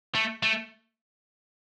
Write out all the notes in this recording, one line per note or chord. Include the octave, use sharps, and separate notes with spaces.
A3
A3